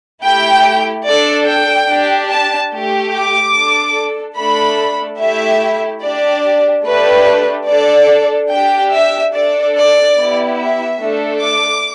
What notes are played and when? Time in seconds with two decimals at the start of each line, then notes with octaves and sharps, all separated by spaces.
0.23 A3 E4 G4 G5
1.05 D4 A4 D5
1.47 G5
1.88 D4 G4
2.30 A5
2.72 A3 G4
3.12 D6
3.54 D4 A4
4.36 A3 D4 A4 B5
5.19 A3 E4 G4 E5
6.03 D4 G4 D5
6.84 A3 D4 G4 B4
7.68 D4 A4 D5
8.50 D4 G4 G5
8.91 E5
9.33 D4 A4 D5
9.75 D5
10.16 B3 E4 G4
10.57 E5
10.98 A3 D4 A4
11.40 D6